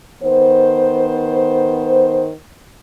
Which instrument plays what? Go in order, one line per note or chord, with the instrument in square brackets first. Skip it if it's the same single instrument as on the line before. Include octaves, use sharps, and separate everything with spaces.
[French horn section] D#3 B3 C5